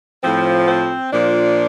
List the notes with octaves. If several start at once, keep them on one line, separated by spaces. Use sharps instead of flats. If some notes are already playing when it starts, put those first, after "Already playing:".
A2 F3 C4
C4
A#2 F3 D4